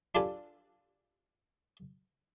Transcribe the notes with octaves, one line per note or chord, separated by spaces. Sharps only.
D4 F4 G4 A4 B4 G#5